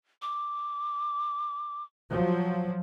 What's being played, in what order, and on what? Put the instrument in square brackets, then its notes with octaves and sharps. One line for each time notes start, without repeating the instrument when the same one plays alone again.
[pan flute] D6
[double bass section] F3 F#3